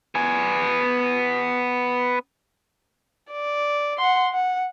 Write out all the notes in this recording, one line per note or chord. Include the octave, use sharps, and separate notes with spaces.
B3 G#5
D5
F#5 C6
F#5